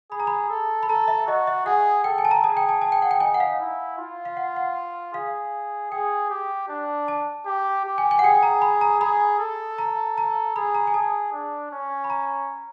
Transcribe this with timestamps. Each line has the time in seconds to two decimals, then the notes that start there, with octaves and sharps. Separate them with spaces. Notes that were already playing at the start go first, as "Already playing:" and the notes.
0.11 G#4 B5
0.20 A#5
0.27 B5
0.50 A4
0.83 B5
0.88 A4 A#5
1.08 E5
1.27 F#4 D#5
1.47 E5
1.66 G#4 F#5
2.04 A4 G5
2.18 G#5
2.25 A5
2.31 A#5
2.44 G#4 A5
2.57 G5
2.69 A5
2.82 A5
2.92 G5
3.02 F#5
3.11 G5
3.20 D#4 G#5
3.34 F#5
3.40 F5
3.60 E4
3.98 F4
4.25 F5
4.37 F#5
4.56 F#5
5.14 G#4 F5
5.92 G#4 G5
6.30 G4
6.69 D4
7.08 A5
7.46 G4
7.85 G4
7.98 G#5
8.11 G#5
8.19 F#5
8.23 G#4 G5
8.43 A#5
8.62 B5
8.81 A#5
9.01 G#4 B5
9.39 A4
9.78 A#5
10.18 A#5
10.56 G#4 B5
10.75 A#5
10.87 G#5
10.94 G#4 A5
11.33 D4
11.72 C#4
12.04 B5
12.10 A#5